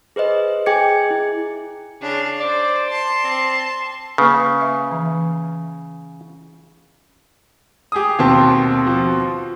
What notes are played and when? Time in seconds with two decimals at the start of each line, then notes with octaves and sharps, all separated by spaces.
0.16 G#4 B4 C5 D#5
0.66 G#4 G5 G#5 D6 G#6 C#7
1.11 E4
2.02 C#3 D4 F5
2.40 C5 D5
2.89 A5 C6
3.24 C4
4.18 C#3 A#3 B4
4.61 E5
4.91 E3
7.92 G4 G#4 D#6
8.19 D#2 B2 C4 G4 A5
8.87 F3